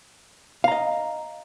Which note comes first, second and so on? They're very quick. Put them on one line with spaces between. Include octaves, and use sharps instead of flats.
F5 A#5 D#5